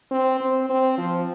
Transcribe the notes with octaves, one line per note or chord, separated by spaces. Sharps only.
C4
C4
C4
F3